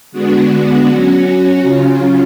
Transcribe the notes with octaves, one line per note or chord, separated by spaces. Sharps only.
D3 G#3 B3 D4 F#4
F#3 C#4 F#4
C#3 F#3 C#4 F4